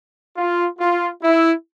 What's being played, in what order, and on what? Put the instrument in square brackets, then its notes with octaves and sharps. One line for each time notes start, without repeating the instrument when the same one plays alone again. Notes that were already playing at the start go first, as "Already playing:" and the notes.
[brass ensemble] F4
F4
E4